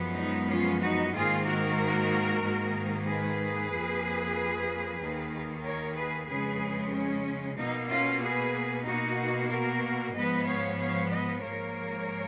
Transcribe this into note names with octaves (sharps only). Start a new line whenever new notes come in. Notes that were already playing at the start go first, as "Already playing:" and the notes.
Already playing: F#2 F3 G#3 B3
D#4
C#4 F4
D#4 F#4
G#2 D#3 A#3 F4 G#4
F#4 A#4
G#2 D#3 A#3
G#4 B4
F2 F3 A#3
D#2 D#3 A#3
A#4 C#5
G#4 B4
F2 C#3 G#3 G#4 B4
C#4
B2 A#3 D#4
C#4 F4
G#4 B4
B2 A#3 D#4 F#4
F#4 A#4
G#2 F3 B3 B4 D#5
C#5 F5
C#5 F5
B4 D#5
G#2 F3 A#3 A#4 C#5